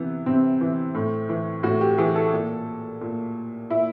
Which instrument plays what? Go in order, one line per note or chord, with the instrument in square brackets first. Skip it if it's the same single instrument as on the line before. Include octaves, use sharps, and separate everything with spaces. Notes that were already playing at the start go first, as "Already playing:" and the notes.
Already playing: [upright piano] C3 E3 B3
C3 C4
E3
A2
E3
A2 F#4
G4
E3 G#4
A4
A#2
A#2
A#2 E4